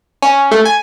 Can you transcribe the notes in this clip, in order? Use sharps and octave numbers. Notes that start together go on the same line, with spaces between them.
C#4
A3
G#5